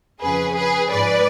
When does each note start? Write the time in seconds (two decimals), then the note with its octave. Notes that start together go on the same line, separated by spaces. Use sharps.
0.22 F2 C#3 F3 G#4 B4
0.56 G#4 B4
0.91 G#2 F3 B4 D5